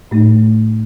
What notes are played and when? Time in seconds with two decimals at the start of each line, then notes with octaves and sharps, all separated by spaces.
0.11 A2 A3 D#4